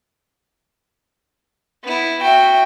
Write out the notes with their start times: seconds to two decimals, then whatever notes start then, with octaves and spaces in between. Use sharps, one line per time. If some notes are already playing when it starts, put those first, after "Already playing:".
1.83 B3 E4
2.22 F#4 E5 G5